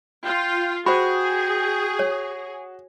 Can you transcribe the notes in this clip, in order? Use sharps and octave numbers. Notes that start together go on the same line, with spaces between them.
F4 G5
F#4 G#4 C5 G5 B5
C#5